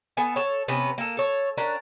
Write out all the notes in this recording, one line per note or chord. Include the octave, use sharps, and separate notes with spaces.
B3 A4 G#5
A4 C#5
C3 B3 C#4
A#3 A4
A4 C#5
C#4 D4 A#4 F#5